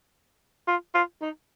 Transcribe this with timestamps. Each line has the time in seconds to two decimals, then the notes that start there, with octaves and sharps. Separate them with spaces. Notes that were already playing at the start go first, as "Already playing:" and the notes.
0.67 F4
0.94 F4
1.21 D#4